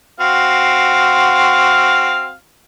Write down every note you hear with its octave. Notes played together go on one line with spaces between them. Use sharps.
C4 F#4 F5